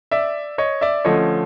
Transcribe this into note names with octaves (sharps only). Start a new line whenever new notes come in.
D5 E5
C#5 D#5
D5 E5
D3 F3 A3 C#4 C#5 D#5